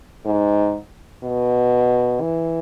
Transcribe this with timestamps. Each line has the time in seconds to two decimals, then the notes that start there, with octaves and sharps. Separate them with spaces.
0.26 G#2
1.23 B2
2.21 E3